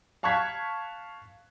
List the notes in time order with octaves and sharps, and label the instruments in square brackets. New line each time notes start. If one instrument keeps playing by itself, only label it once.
[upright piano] F5 A5 C#6 F#6 G#6 B6